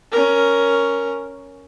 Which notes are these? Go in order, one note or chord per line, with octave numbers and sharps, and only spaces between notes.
C#4 A#4